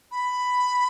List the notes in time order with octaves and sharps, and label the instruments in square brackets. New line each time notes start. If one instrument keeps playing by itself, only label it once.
[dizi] B5